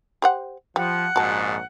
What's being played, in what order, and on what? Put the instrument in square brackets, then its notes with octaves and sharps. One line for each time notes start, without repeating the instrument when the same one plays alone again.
[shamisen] G4 C5 F#5
[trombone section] F3 [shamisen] G3 [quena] F#5
[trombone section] A#1 G#2 [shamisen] F#4 A5